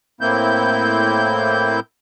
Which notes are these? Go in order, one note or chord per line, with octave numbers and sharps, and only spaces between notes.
A2 A#3 C4 E4 G6